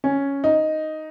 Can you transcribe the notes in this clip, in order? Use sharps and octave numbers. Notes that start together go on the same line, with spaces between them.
C#4
D#4